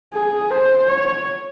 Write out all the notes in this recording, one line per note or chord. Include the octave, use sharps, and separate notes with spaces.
G#4
C5
C#5